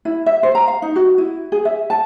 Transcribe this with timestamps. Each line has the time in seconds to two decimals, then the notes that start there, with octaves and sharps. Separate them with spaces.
0.05 E4
0.26 E5
0.43 C5
0.55 A#5
0.67 F5
0.82 D#4
0.96 F#4
1.18 E4
1.52 G#4
1.65 E5
1.90 A5